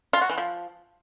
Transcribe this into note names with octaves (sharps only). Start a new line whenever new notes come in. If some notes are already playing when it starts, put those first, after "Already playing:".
F4
F#4
E3
F3